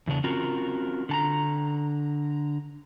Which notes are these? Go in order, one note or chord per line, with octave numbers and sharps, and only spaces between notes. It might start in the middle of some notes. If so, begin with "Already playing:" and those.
E2 C#3 B3 D4
C4 C#4 F4 F#4 A#4
D3 A5 A#5